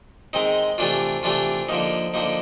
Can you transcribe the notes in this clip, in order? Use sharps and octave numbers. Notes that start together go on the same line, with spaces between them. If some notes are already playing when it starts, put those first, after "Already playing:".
D#3 G#3 C4 D#4
C3 E3 A3 D4 F4
C3 E3 A3 D4 F4
D3 F3 A#3 D#4
D3 F3 A#3 D#4